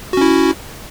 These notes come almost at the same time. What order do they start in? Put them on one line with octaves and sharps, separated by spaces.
F#4 C#4 E4